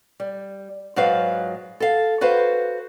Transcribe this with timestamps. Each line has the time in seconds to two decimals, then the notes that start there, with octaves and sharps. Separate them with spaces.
0.20 G3
0.96 G#2 F#3 F4 B4 F5
1.80 A4 F5
2.21 F#4 B4 C5 F5